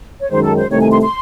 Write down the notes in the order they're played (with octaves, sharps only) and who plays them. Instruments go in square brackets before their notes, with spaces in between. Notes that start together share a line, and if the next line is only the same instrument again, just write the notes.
[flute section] C#5
[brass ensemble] F#2 D#3 G#3 [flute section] C5
[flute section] A4
C5
[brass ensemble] C2 C3 D#3 A3 [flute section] C#5
[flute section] G#5
C6
C6